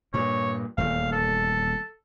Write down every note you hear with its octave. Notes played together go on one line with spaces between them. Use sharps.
G2 A#2 C#5
D#1 E2 A3 F5
A4